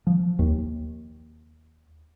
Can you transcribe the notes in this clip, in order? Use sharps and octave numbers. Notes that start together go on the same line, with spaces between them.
F3
D#2